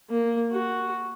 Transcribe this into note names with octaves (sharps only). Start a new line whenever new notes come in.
A#3
F#4